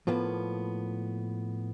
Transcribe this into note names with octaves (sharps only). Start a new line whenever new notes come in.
A2 F3 A#3 B3